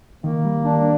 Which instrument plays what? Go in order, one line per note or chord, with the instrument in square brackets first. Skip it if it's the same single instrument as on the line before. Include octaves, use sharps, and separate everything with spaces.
[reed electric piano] D#3 [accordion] A#3
[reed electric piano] G3
[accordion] D4